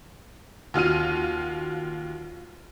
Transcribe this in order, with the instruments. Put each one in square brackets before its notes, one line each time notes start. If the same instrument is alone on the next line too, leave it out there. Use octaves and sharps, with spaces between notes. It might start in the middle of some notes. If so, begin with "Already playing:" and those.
[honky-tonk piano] D#2 F4 F#4 F6 D#7